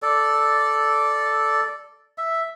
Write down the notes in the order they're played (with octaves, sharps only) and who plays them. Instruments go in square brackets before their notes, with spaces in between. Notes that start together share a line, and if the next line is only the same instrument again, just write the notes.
[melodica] A4 D5
E5